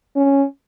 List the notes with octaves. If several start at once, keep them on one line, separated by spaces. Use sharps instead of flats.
C#4